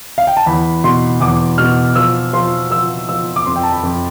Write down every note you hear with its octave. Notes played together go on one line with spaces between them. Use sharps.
F5
G5
A5
E2 B5
B2 C6
E2 D6
B2 F6
F3 E6
F3 C6
F3 E6
F3 E6
D6
F2 C6
G5
A5
B5
F2